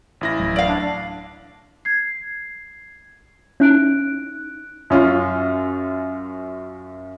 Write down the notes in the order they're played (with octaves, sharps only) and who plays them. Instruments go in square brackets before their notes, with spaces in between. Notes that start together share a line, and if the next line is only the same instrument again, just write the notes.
[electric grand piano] A1 E4 A#6
[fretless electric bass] D1 F#3
[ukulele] D5 F5
[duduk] D4
[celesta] G#6 C7
[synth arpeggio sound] C#4 E4 [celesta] D#4 F#6 D7
[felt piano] F#2 C#4 F4